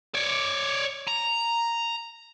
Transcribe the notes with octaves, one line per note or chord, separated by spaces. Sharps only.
C#5 D5
A#5